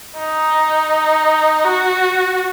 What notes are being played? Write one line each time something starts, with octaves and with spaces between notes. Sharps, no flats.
D#4
F#4